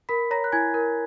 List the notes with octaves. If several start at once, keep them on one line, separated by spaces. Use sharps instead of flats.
A#4 B5 B6
C#5 A#5 A#6
F#6
E4 G#5 G#6
A#4